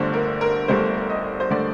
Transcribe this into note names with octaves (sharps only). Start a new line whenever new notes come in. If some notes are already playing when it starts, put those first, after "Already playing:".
Already playing: G1 G2 D3 A3 C5
A#4
A#4
G1 G2 D3 A3 C5
D#5
C5
D3 A3 D5